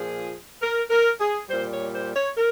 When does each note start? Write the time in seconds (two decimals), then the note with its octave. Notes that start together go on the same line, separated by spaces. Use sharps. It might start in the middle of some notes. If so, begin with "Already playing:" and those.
Already playing: A#2 F3 G#4
0.61 A#4
0.90 A#4
1.20 G#4
1.48 A#2 G3 C5
1.70 C#5
1.92 C5
2.14 C#5
2.36 A#4